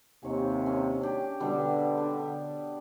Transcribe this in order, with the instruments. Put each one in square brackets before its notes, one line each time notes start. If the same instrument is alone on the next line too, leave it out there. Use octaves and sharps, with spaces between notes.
[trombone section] D#2 C3 [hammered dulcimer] C#5 G#5
[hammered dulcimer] C#4
D4 G4
[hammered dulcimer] B2 G3 D4 [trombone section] D3
[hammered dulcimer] D4